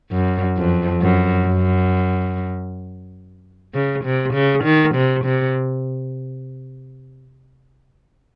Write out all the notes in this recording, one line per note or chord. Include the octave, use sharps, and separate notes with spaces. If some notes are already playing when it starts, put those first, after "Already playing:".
F#2
F2
F#2
F#2
C#3
C3
C#3
D#3
C3
C3